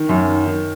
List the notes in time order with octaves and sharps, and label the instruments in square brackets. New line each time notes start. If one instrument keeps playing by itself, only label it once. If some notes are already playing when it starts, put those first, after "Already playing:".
Already playing: [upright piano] D#3
F#2
D#3
D#3